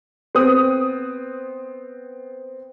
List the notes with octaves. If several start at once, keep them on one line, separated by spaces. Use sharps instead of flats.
B3 C4 D#6